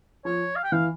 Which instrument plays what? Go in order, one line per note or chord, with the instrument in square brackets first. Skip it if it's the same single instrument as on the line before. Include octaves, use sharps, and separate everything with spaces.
[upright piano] F3 [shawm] C#5
[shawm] F5
G5
[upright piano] E3 [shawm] F5